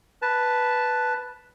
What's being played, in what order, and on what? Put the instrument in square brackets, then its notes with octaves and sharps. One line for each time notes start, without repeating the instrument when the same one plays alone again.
[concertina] B4 A5